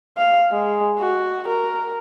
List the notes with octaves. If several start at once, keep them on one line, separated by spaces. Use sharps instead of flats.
F5
G#3
F#4
A#4